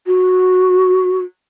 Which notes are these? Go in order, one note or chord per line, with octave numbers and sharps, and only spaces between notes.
F#4